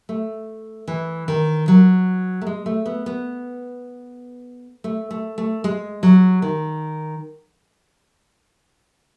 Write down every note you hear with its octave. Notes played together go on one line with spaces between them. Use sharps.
A3
E3
D#3
F#3
A3
G#3
A3
B3
B3
A3
A3
A3
G#3
F#3
D#3